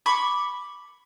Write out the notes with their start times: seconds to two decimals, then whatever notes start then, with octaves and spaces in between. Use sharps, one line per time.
0.06 B5 C#6 D6